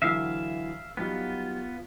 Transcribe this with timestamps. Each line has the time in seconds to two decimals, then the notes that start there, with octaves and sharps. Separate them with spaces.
0.02 D3 E3 F#3 E5 F5
0.97 F#3 G3 B3 D#4 F4